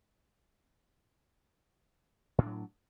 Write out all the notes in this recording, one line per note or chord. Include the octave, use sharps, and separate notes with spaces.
A2 F#3 D4